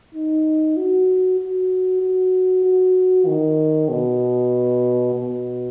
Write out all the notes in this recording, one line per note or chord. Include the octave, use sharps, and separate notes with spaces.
D#4
F#4
F#4
F#4
F#4
D#3
B2
B2